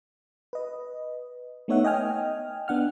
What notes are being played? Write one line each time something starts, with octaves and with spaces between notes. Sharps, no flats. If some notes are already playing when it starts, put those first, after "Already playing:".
B4 D#5
A3 B3 D#4 C#5 E5 F#5
D#5 G5 G#5 F6
B3 D4 F#5 F6